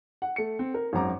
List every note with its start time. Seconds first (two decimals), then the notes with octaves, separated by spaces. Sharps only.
0.22 F#5
0.36 A3 C#7
0.59 C4
0.74 A#4
0.93 G#1 F#2 A#5 D6